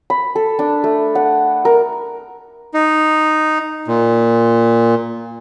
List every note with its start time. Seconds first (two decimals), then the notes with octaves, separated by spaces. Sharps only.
0.10 B5
0.36 A4
0.59 D4
0.84 A3
1.15 F#5
1.65 A#4
2.74 D#4
3.87 A#2